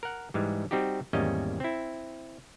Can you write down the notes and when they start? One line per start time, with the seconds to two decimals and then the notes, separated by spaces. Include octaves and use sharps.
0.03 A#4 F#5
0.34 G#2 E3 G3 G#3
0.71 G3 C4 D#4 F#4 G4
1.13 G#1 E2 G3 A#3 C#4 D#5
1.60 C4 E4